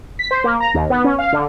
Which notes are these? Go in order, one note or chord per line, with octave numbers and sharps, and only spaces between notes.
B6
C5
A#3
A#5
D#2
B3
C#4
F5
D3